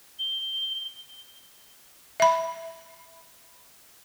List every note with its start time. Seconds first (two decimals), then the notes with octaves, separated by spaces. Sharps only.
0.19 G7
2.20 E5 B5